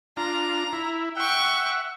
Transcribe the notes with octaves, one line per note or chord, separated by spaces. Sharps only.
D4 F4 A#5
E4
E5 F#5 G5 C#6